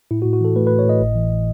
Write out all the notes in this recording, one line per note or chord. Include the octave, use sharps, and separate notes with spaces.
A2 E4
F#4
A2
F#4
E3 A4
A3 B4
B4
A2
C#5
A2 D#5
G#1
E3